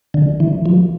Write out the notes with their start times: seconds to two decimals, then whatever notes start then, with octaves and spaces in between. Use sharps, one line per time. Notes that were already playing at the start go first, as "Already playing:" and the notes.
0.14 D3
0.40 E3
0.66 F3